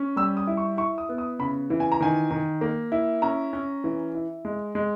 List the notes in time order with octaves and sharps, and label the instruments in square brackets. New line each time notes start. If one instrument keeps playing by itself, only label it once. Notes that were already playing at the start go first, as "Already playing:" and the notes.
Already playing: [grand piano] C#4
G3 E6
D#6
E4
C#6
E4 C#6
D#6
B3
D#6
C#3 B5
E3
G#5
A#5
D#3 G#5
D#3
A#3
E4
C#4 A#5
C#4
E3
E4
G#3
G#3